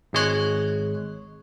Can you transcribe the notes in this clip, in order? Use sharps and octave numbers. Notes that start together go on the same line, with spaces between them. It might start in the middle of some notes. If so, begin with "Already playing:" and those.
G#1 G#3 C#5 F#6